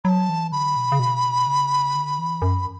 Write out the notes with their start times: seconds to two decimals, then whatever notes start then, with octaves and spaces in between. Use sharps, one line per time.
0.04 F#3 A5 B5
0.29 E3
0.52 D3 B5
0.77 B2
0.92 C#3
0.99 B2
1.47 C#3
1.95 D3
2.19 E3
2.42 F#2